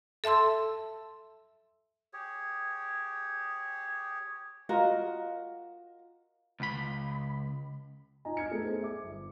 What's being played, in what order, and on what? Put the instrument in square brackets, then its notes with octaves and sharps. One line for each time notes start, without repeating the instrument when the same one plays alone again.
[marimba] A4 E5 A5 C6 E6
[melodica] G4 G#4 C#5
[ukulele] F4 F#4 A#4 D#5
[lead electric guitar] C#2 B5
[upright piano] D#4 F4 D#5 G#5 A#5
D#4 F6 G#6 C#7
A3 B3 D#4 G#4 A4
G#4 C5
E5 D6
G1